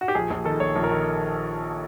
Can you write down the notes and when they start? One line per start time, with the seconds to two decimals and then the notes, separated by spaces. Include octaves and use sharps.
0.01 F#4
0.08 G4
0.15 A#1 G#4
0.30 A#1 G#4
0.45 D#3 A4
0.60 A#1 C#5
0.76 A#1
0.83 A#4
0.91 D#3